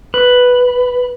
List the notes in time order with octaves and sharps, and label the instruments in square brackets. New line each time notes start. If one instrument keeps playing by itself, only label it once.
[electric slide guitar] B4